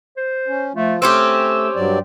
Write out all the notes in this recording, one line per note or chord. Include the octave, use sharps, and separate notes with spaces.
C5
C#4
F3 A3 F4
A3 C4 C#4 G4 E6
G2 F#3 D5